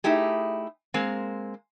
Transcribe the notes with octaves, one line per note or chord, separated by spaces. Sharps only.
A3 D#4 E4 G4 G#4
G#3 A#3 C4